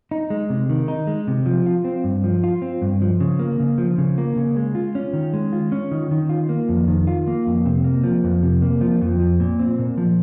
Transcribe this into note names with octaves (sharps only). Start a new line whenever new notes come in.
D#4
G#3
C3
D#3
D#4
G#3
C3
F3
F4
C4
G2
F3
F4
C4
G2
F3
C#3
A#3
C#3
F3
C#3
A#3
C#3
G#3
F4
C#4
D#3
G#3
F4
C#4
D#3
D#3
F4
A#3
F2
D#3
F4
A#3
F2
C3
A#3
F3
F2
C3
A#3
F3
F2
F3
A#2
C4
A#2
F3